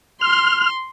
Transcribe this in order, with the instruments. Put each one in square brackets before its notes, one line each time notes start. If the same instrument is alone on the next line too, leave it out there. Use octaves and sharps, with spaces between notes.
[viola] C6 [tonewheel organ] F6